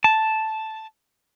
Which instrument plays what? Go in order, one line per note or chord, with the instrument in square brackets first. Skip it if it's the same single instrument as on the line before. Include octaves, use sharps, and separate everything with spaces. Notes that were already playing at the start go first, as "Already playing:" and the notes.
[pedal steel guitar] A5